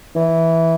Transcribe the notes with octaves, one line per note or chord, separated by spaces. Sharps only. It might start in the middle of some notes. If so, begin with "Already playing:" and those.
E3